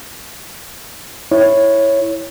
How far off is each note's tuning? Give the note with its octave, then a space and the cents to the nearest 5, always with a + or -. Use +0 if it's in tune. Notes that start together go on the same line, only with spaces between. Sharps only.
E4 +0 C#5 -5